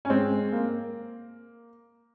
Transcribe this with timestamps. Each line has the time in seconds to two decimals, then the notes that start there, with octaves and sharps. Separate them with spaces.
0.05 C#4
0.10 G#3 C4
0.52 A#3